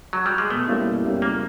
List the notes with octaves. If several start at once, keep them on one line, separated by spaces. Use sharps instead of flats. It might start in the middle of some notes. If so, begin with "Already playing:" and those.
F#3
G3
G#3
B2 A3
G3 A#3 C#4 E4
B2
G3 A#3 C#4 E4
C#3 A#3